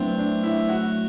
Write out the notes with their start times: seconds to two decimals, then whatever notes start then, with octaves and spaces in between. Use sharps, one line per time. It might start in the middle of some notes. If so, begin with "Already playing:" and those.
Already playing: F#3 A3 B3 C4 D4 E4
0.18 D4
0.43 E4
0.69 F#4